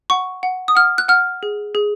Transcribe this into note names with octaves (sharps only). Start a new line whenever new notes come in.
F#5 C#6
F#5
D#6
F#5 F6
F#6
F#5 F6
G#4
G#4